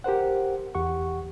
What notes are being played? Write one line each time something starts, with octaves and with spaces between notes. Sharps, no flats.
G4 A#4 C5 F#5
E2 G4 F#5 C#6